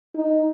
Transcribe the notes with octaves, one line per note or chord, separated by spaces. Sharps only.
D#4